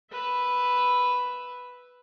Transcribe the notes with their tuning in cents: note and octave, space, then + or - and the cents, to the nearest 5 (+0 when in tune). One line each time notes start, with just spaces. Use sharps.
B4 +0 E5 +0